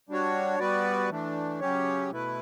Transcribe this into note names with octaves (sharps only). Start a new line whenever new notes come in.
G3 D4 F#4 C#5
G3 B3 F#4 B4 D5
E3 A3 D4
C#3 F#3 C#4 G4 C#5
B2 A3 E4 B4